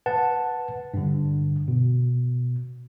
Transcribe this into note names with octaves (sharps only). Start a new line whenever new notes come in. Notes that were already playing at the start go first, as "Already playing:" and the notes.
B4 F#5 A5
G2 D3
B2